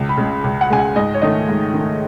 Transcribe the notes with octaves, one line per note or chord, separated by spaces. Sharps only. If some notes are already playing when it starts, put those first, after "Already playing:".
Already playing: C#2
B5
C#3 G#3
C#2
F#5
C#3 G#3 G#5
F#5
G#2 D#5
C#5
D#3 A3 D#5
G#2
D#3 A3